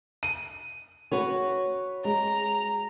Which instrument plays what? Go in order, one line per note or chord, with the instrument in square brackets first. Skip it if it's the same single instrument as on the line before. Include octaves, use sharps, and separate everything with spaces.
[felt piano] D#7
[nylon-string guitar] F#4 B4 C#5
[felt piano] G#3 [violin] A#5